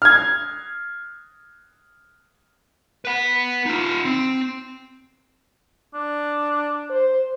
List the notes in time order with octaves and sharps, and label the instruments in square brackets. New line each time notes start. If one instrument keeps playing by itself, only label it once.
[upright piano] F6 G#6
[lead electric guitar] B4 F#5
D#4 F4
C4
[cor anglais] D4
[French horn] C5